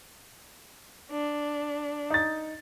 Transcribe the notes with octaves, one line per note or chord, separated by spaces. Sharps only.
D4
D#4 A6